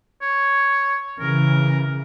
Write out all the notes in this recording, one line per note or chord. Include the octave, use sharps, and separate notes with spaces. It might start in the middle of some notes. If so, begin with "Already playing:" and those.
C#5
C#3 E3 A#4